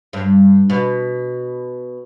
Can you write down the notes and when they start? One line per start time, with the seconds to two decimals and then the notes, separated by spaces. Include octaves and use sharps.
0.13 G2
0.70 B2